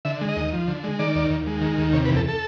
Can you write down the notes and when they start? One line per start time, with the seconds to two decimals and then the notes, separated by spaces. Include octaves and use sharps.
0.05 D3 E5
0.21 G#3
0.29 D#5
0.36 D#2
0.53 F3
0.68 D3
0.84 G#3
0.99 D#3 D5
1.16 D#2
1.30 D#2
1.47 G#3
1.61 D#3
1.78 D#2
1.93 C3 C#5
2.05 B4
2.09 E2
2.17 A4
2.28 A4